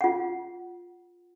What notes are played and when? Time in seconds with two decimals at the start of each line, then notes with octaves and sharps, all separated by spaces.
0.01 F4 F#5